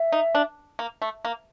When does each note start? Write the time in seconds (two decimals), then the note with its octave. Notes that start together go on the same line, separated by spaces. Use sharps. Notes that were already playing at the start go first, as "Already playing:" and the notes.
Already playing: E5
0.12 D#4
0.35 D4
0.79 A#3
1.02 A3
1.25 A#3